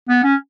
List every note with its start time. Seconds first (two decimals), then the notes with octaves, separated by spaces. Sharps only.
0.09 B3
0.23 C#4